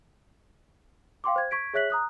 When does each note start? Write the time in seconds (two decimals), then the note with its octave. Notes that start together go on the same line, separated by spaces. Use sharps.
1.24 F5 G5 C6 D6
1.36 C5 G#6
1.51 C#6 G#6 B6 D7
1.74 G#4 C#5 E5 F#6 B6 F#7
1.90 A#5 D#6 F#6